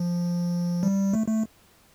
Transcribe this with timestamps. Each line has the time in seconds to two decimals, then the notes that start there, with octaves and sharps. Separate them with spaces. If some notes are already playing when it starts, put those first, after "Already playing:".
Already playing: F3
0.83 G3
1.13 A3
1.28 A3